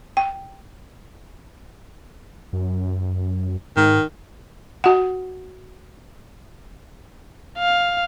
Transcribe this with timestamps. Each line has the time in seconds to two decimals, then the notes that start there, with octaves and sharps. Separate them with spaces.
0.17 G5
2.53 F#2
3.77 G#2 D#3
4.84 F#4 F#5
7.59 F5